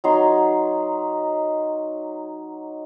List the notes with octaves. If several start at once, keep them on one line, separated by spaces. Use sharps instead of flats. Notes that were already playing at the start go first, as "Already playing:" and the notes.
F#3 D#4 C6